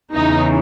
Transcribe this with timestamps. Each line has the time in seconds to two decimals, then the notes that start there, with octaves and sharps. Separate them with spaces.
0.14 E2 C#3 E3 D#4